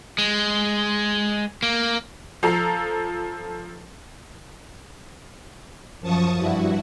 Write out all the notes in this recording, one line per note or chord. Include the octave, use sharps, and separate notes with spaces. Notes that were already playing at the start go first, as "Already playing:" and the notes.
G#3
A#3
F3 A4 A#5 C7
F#2 F3 A5 C#6 D#6
G2 E4 F#4